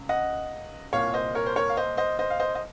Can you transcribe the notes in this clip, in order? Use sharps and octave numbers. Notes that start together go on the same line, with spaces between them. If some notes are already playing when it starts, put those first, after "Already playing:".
Already playing: C#2 C#3
D#5 F#5
C2 A#2 C#5 F5
C5 D#5
A#4 C#5
C5
A#4 C#5
F5
C5 D#5
C5 D#5
C5 D#5
F5
C5 D#5
D#5